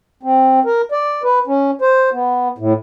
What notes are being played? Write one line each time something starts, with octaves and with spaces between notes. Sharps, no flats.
C4
A#4
D5
B4
C#4
C5
B3
A2